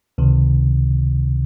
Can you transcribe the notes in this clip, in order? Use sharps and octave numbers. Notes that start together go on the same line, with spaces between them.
C#2 C3 D#3